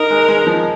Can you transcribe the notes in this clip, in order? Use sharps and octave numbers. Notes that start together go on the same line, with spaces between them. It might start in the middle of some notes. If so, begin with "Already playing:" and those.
Already playing: D#4 A#4
G#3
G#3
F3